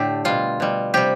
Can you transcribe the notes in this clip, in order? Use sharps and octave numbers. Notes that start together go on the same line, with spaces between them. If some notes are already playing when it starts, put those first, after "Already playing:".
Already playing: A2 D3 A3 G4
B2 G3 F4
B2 G3
C3 G3 G4